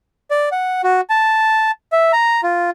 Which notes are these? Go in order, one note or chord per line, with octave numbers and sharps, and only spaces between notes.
D5
F#5
F#4
A5
E5
A#5
F4